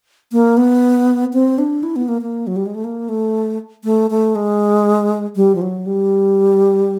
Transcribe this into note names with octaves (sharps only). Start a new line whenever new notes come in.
A#3
B3
C4
D4
E4
B3
A#3
A#3
F#3
G3
G#3
A3
A#3
A3
A3
A3
G#3
G3
F3
F#3
G3